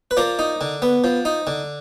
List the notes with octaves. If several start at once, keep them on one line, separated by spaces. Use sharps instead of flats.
B4
F3 A#4 D5
D#4
D3
B3
F3
D#4
D3